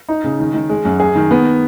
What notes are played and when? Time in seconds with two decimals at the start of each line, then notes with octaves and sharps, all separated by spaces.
0.09 D#4
0.24 C#3
0.40 D#3
0.54 D#3
0.69 G#3
0.85 F#2
1.00 G#4
1.15 D#3
1.31 B3